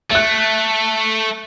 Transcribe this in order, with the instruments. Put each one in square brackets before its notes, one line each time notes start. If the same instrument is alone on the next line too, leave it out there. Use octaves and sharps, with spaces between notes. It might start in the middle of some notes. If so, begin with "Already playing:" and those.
[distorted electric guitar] A3 [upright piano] E5 F#6